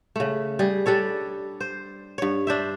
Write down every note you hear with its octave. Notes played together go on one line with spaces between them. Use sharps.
C#3 A3
G3 G#4
G3 D4 A4 C#5
C5
G2 C#5
D4 C5 E5